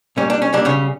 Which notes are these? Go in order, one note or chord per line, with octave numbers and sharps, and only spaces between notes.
B1 A#2 G3 C#4
D4
C#4
B1 A#2 G3 D4
C#3 C#4